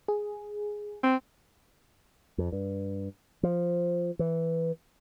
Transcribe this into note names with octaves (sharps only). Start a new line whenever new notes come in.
G#4
C4
F2
G2
F3
E3